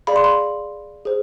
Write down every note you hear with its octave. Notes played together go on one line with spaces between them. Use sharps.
G#4 D5 F5 B5
C6
B5
G#4 C5